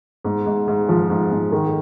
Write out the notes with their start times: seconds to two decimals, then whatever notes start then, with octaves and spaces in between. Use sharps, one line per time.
0.25 G#2
0.46 G#2
0.68 G#2
0.89 F3
1.10 G#2
1.31 G#2
1.52 D#3